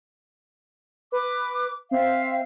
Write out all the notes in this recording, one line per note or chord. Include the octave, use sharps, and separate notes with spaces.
B4 D6
C4 E5 F5